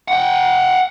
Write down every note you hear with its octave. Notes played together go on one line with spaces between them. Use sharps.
F#5 G5